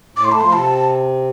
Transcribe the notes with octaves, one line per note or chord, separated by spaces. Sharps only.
A2 D6
C6
A3 A5
F3 C6
C3 A5